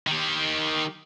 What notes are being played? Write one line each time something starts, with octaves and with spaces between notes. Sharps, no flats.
D#3 G4